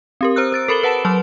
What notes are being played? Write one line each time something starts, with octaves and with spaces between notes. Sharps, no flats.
C4 G4 A#4
C5 A#5 E6 F#6
C5 A6 D7
A4 A#4 B5 A6 F#7 G7
B4 F#5 A5 D7 E7
F#3 B4 C6 F6